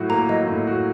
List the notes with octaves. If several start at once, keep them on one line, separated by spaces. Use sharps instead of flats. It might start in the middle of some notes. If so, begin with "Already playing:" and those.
Already playing: A2 F#3 F#4
A#3 A#5
F#3 D#5
A2
F#4